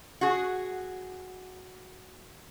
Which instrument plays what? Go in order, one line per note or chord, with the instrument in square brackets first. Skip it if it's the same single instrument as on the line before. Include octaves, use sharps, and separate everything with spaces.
[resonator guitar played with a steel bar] F#4 G#4